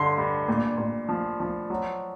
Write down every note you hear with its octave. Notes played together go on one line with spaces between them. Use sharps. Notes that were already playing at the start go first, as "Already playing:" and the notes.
Already playing: G2 D3 C6
G2
A#2
A#2
F3
F3
F#3